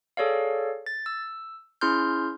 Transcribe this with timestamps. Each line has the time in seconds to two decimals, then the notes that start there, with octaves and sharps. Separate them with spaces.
0.17 G#4 A4 C#5 D5 F5
0.86 A6
1.06 E6
1.81 C#4 E4 G#4 C6 F6 G6